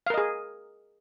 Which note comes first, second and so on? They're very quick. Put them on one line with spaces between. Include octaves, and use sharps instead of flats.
F5 A#4 D#5 G#4